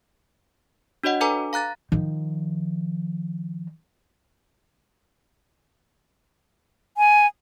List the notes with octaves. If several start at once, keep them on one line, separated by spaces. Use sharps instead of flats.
D4 F#4 C#5 D#5 F#5
D4 A4 B4 G#5 A#5 D6
F5 A#5 F#6 A6
D#3 F3
G#5